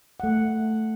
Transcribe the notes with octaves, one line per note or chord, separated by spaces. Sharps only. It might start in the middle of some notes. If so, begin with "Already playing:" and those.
A3 F#5